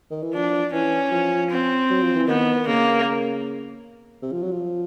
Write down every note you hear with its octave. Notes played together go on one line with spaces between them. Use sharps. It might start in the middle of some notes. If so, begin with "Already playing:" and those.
D#3
E3
F3 D4
E3 C#4
F3
C4
F#3
F3
E3
D#3 B3
C#3 A#3
C3
F3
F#3
F3